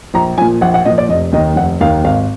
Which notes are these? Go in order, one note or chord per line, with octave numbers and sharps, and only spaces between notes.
A#1 A#5
A#2 F3 G#5
A#1 F#5
F#5
A#2 F3 D#5
D5
F1 D#5
D#2 D#3 D#5
F1 F#5
D#2 D#3 F5
G#1 F5